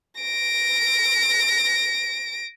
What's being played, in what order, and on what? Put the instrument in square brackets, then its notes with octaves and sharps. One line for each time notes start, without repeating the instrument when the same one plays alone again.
[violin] A#6 D7